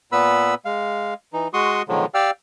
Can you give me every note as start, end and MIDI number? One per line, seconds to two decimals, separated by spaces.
0.12 0.54 46
0.12 0.54 59
0.12 0.54 71
0.12 0.54 83
0.12 0.54 88
0.65 1.14 56
0.65 1.14 77
1.33 1.48 52
1.33 1.48 63
1.53 1.82 56
1.53 1.82 66
1.53 1.82 84
1.53 1.82 85
1.53 1.82 87
1.89 2.06 47
1.89 2.06 50
1.89 2.06 51
1.89 2.06 53
1.89 2.06 54
1.89 2.06 56
2.14 2.31 67
2.14 2.31 74
2.14 2.31 77
2.14 2.31 79
2.14 2.31 88
2.14 2.31 89